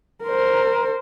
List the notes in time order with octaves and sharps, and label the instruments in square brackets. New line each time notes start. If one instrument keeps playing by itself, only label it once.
[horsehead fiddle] A#4 C5